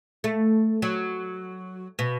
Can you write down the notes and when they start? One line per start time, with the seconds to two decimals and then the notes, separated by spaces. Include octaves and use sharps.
0.24 A3
0.82 F#3
1.99 B2